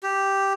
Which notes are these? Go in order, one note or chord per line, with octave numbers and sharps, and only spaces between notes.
G4